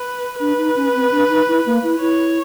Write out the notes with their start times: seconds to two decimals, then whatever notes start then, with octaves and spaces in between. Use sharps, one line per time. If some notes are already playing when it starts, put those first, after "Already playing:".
Already playing: B4
0.40 D4 B4
0.58 D#4
0.76 C#4
0.95 C4
1.12 D4
1.29 D#4
1.48 E4
1.66 A#3
1.83 E4
2.01 E4 C#5